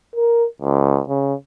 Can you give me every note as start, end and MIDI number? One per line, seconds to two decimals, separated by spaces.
0.15 0.46 70
0.62 1.02 37
1.09 1.34 49